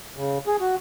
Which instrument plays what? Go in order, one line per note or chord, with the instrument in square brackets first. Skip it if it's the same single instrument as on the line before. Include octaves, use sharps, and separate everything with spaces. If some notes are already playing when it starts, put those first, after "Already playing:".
[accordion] C#3
G#4
F#4